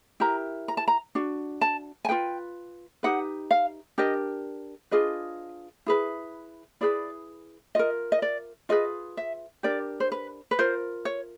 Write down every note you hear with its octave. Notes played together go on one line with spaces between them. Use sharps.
E4 G4 A#4 A#5
A#5
A5
A#5
D4 F#4
A5
G#5
F4 G#4 B4 G5
D#4 G4 B4 F#5
F5
D4 G4 A#4 D#5
D4 F4 G#4 B4 D#5
E4 G#4 B4
E4 G#4 B4 D5
F4 A#4 D#5
D#5
D5
F4 G#4 B4 D#5
E5
D4 G4 A#4 D5
C5
B4
B4
F4 A#4 C5
C#5